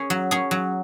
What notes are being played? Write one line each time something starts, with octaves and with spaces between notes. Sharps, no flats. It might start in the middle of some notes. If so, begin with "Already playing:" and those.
Already playing: C#4 G#4
F#3
C#4 G#4
F#3